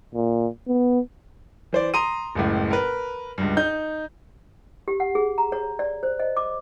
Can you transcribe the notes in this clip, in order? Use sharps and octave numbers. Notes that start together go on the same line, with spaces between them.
A#2
B3
E3 C5 D5
A#5 C6 D#6 D#7
F#1 C#2 A2
A#4 B4
C#2 G2
D#4 G6
G4
F#5
G#4
A#5
C#5
D5
C5
D#5
D6